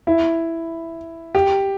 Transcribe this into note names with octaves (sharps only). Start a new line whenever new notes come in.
E4
G4